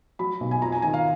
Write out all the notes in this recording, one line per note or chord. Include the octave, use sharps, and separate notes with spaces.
F#3 B5
B1
G#5
F2 A#5
G#5
D#3 G#5
F5